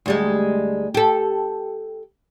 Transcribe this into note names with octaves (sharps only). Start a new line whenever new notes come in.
D2 G3 G#3
G4 A4